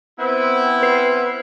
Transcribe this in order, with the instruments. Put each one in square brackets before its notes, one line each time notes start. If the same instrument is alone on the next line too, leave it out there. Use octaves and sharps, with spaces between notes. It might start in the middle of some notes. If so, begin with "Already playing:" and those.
[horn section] B3 C4 E4
[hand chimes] B4 C7